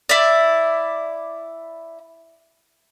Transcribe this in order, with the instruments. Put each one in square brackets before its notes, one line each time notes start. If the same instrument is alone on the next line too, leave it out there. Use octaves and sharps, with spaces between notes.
[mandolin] E4 D5